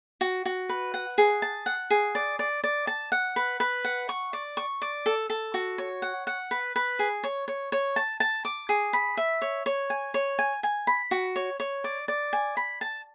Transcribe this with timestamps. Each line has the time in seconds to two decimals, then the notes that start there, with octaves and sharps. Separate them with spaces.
0.21 F#4
0.45 F#4
0.69 B4
0.94 F#5
1.18 G#4
1.42 A5
1.66 F#5
1.90 G#4
2.15 D5
2.39 D5
2.64 D5
2.87 A5
3.12 F#5
3.36 B4
3.60 B4
3.85 F#5
4.09 C#6
4.33 D5
4.57 C#6
4.82 D5
5.06 A4
5.30 A4
5.54 F#4
5.78 C#5
6.02 F#5
6.27 F#5
6.51 B4
6.76 B4
6.99 G#4
7.24 C#5
7.48 C#5
7.72 C#5
7.96 A5
8.20 A5
8.45 D6
8.69 G#4
8.93 B5
9.17 E5
9.42 C#5
9.66 C#5
9.90 G#5
10.14 C#5
10.39 G#5
10.63 G#5
10.87 B5
11.11 F#4
11.36 C#5
11.60 C#5
11.84 D5
12.08 D5
12.33 G#5
12.57 B5
12.81 A5